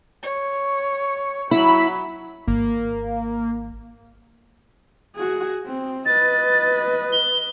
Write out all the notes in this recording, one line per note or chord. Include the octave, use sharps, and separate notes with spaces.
C#5
F#3 E4 B5
G#1 A#3
F#4 G#4
C4
B4 D#5 A6
G7